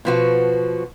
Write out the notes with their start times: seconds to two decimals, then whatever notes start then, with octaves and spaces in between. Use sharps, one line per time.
0.05 B2 F3 F#4